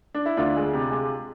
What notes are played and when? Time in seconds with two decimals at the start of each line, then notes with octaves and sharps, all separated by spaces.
0.15 D4
0.26 E4
0.37 D2 D4 F4
0.56 G#3
0.73 C3
0.91 G#3